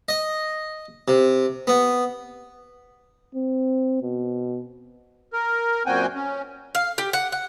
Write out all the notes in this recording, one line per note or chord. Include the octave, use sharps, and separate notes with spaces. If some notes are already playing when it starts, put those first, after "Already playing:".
D#5
C3
B3
C4
B2
A#4
F#2 A#2 C4 F#4 G5 G#5
C#4
F5
G4
F#5
F#5